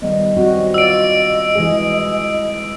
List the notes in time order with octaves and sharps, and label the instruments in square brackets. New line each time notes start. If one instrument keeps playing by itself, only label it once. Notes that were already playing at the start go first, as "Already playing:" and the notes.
[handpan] D#3 G3 B3 [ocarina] D#5
[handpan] F#3 C4 F#4
[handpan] F4 D5 [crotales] E6 D7
[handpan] E3 G#3 G#4